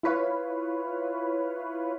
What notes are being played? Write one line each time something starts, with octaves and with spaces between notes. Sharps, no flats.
E4 F4 B4 C#5 F5